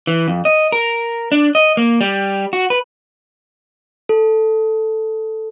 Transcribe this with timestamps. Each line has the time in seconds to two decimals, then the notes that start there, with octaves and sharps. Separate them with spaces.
0.07 E3
0.28 F2
0.45 D#5
0.72 A#4
1.32 D4
1.55 D#5
1.77 A#3
2.01 G3
2.53 F#4
2.70 B4
4.09 A4